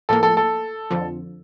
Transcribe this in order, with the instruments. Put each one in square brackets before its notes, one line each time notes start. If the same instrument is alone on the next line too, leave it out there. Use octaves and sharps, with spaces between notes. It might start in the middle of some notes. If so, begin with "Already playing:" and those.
[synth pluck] A2 F3 A#3 [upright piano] A4
[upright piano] A4
A4
[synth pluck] F2 D3 F3